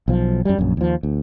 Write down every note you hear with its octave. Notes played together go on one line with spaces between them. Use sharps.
B1 F3
F#2 G3
A#1 F#2
D#2 F3
D2